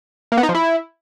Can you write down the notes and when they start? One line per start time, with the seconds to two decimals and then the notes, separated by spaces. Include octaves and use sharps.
0.32 A#3
0.37 B3
0.43 D#4
0.49 F3
0.55 E4